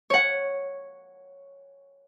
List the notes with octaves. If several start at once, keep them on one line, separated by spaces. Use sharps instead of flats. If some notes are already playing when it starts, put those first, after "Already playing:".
C#5 F#5